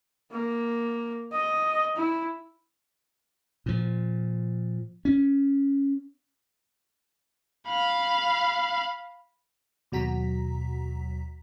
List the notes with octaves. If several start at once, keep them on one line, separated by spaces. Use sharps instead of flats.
A#3
D#5
E4
A#2 F3
C#4
F5 B5
D#2 B2 F#3 F#4 A#5 B6